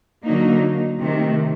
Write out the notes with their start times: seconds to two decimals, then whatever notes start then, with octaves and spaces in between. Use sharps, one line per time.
0.25 D3 F#3 A#3 D#4
1.00 C3 D#3 A3